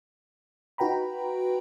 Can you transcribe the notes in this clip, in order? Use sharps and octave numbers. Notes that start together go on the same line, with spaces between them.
D#4 F#4 B4 G5 A#5 B5